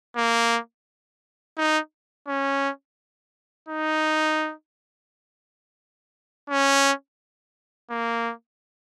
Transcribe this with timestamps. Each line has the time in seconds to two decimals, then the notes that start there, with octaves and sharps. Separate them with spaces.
0.16 A#3
1.57 D#4
2.27 C#4
3.69 D#4
6.50 C#4
7.90 A#3